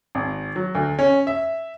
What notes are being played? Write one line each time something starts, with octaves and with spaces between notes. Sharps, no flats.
G#1
F#3
D2
C#4
E5